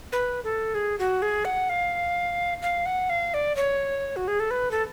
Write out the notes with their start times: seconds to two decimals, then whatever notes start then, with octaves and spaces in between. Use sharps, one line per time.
0.12 B4
0.44 A4
0.75 G#4
0.99 F#4
1.22 G#4
1.45 F#5
1.69 F5
2.62 F5
2.86 F#5
3.10 F5
3.34 D5
3.56 C#5
4.16 F#4
4.28 G#4
4.40 A4
4.51 B4
4.71 A4